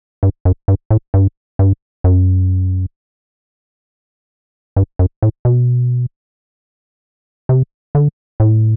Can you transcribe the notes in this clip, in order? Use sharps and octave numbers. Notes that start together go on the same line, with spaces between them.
G2
F#2
G2
A2
G2
G2
F#2
G2
F#2
A2
B2
C3
D3
A2